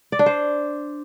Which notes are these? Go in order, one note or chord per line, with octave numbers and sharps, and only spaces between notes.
D5
D4
C5